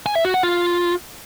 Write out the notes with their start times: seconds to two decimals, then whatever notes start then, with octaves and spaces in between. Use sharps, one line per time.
0.06 G#5
0.15 E5
0.25 F#4
0.34 F#5
0.43 F4